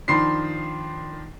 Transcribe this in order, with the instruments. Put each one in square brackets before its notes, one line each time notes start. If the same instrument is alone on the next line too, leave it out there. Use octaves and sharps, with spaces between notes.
[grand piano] D#3 F3 D4 [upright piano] B5 C6 C7